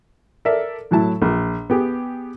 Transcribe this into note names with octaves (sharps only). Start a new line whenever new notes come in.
A4 A#4 D5 E5
A2 F#3 E4 A5
A#1
B3 G4 G#4